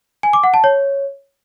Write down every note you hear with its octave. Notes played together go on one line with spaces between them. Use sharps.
G#5
D6
F#5
A5
C#5